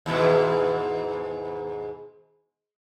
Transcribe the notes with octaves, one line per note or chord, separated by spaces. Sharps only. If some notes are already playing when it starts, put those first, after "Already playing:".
D#2 G#2 B2